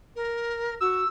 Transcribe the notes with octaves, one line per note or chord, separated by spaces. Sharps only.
A#4
F#4 E6